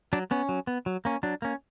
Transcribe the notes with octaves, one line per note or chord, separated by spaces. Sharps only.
F#3 D4
B3 C#4
F#3
B3
F#3
A#3 C#4
F#3 D4
A#3 C#4